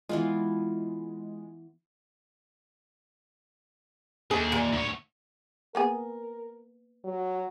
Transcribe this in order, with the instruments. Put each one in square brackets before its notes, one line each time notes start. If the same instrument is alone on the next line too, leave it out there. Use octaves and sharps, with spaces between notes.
[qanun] E3 B3 F4 [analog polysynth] G#3
[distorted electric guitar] D#2 [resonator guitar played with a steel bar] G#4
[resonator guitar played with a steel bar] A#2
[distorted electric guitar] D2 C#5
[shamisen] A#3 B3 G#4 [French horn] A#4
[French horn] F#3